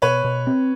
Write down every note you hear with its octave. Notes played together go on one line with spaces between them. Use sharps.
B2 B4 C#5
B2
C4